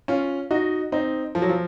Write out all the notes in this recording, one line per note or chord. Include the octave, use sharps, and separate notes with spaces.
C#4 F4
D#4 F#4
C4 D#4
F3
F#3
F3